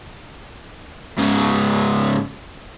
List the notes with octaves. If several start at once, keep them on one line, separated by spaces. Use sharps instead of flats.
G#2 C#3